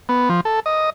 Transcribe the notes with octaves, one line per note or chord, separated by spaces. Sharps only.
B3
F3
A4
D#5